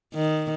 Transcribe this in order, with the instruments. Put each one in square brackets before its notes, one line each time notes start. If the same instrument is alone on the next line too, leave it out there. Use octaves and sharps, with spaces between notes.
[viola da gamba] D#3